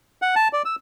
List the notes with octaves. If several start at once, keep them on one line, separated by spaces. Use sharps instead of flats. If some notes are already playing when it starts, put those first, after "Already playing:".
F#5
A5
D5
E6